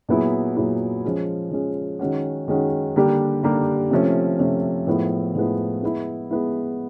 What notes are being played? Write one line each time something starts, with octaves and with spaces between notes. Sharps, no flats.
A#2 F#3 B3 E4 G#4
A#2 F#3 B3 E4 G#4
F3 G#3 C#4
F3 G#3 C#4
D#3 G#3 C#4 F#4
D#3 G#3 C#4 F#4
D3 G3 A#3 D4 G4
D3 G3 A#3 D4 G4
C3 F3 A3 C#4
C3 F3 A3 C#4
A2 F3 G#3 B3 E4
A2 F3 G#3 B3 E4
G#3 B3 E4
G#3 B3 E4